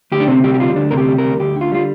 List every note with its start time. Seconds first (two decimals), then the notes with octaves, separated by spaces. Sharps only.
0.12 D2 G4
0.20 D4
0.28 C3 C4
0.44 G3 G4
0.54 G4
0.60 D2 F4
0.76 D2 D4
0.91 C3 A#4
0.97 G4
1.08 G3
1.18 A#4
1.24 D2
1.40 D2 G4
1.56 D3
1.61 F4
1.72 G3 F4